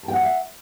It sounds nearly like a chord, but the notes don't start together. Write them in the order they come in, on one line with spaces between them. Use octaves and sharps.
A5 G5 F#5 D#5 E5